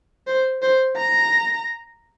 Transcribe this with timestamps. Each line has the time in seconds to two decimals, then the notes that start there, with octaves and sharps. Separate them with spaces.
0.27 C5
0.62 C5
0.97 A#5